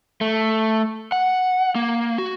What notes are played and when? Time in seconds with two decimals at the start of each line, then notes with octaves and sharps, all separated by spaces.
0.21 A3
1.12 F#5
1.75 A#3
2.18 F#4